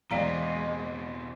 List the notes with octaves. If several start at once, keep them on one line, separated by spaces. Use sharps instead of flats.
E2 B2 G#3 C4 D5 F5 G5 A#5